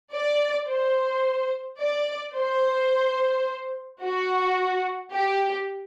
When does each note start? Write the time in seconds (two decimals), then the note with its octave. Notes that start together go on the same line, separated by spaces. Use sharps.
0.13 D5
0.68 C5
1.79 D5
2.35 C5
4.02 F#4
5.13 G4